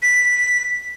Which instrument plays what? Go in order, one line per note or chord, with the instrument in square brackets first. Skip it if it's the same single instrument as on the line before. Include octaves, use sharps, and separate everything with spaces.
[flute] B6